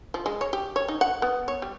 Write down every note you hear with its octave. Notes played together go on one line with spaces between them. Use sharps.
F3
G#3
C#5
G4
C#5
D#4
F#5
B3
C#5
G3